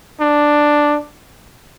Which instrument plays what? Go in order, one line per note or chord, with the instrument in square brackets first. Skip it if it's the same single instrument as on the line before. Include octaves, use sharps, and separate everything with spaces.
[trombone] D4